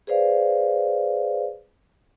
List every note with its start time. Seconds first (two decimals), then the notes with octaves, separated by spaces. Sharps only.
0.07 G#4 B4 C5 D5 F5